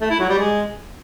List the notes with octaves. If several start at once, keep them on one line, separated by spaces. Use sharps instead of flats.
A3
E4
F#3
G3
G#3